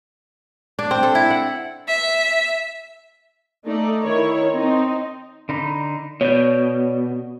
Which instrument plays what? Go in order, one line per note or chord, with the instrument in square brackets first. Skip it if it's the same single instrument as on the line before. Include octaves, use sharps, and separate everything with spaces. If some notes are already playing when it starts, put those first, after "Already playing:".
[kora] D4
C4
A4
E4
F#5
[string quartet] E5
[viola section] A3 D#4 D5
D#3 E4 C#5
C4 D#4
[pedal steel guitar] D3 D#4 B5
[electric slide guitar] B2 [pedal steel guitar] C#5 D5 G6